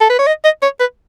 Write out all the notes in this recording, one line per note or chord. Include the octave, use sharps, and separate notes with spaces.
A4
B4
C#5
D#5
D#5
C#5
B4